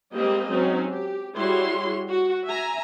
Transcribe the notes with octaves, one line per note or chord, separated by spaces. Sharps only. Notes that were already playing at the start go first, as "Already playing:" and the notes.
G3 G#3 A#3 C4 G4 D#5
F#3 C4 C#4 D#4
G4
G3 E4 F#4 G#4 C#5 C6
F#4
E5 G#5 A#5